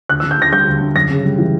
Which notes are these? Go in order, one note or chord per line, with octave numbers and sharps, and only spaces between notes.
D2 F#6
E6
D3
G6
D2 A#6
G3 G6
D2
D3
F#2 A#6
C#3
G3
E3